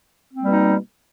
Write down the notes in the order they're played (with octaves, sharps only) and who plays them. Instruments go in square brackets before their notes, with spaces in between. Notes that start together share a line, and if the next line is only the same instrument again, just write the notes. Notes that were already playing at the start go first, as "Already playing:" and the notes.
[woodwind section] C4
A#3
G3
B2
D#4